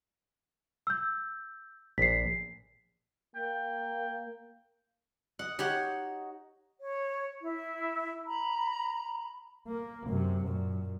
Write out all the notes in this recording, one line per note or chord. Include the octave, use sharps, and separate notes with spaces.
E6 G6
A#1 B6 C7
A#3 G5
D#5 F#5
D#4 F#4 G4 C#5 F#5
C#5
E4
A#5 B5
A#3
F#2 C3
F#2 A#2